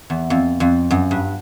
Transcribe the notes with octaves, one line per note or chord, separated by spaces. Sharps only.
E2
F2
F2
F#2
G2